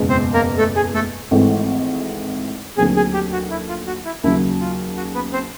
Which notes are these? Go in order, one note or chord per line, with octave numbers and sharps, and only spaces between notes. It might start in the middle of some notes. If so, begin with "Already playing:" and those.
Already playing: F#1 E2 B2 G#3
C4 C5
A#3 A#4
A3 A4
G#4
A3 A4
G#1 G#2 E3 A3 C4
D#2 D3 F#3 A3 C4 G#4
G#4
G4
F#4
E4
F4
F#4
E4
D#2 C#3 F#3 E4
F4
F#4
B3 B4
C4 C5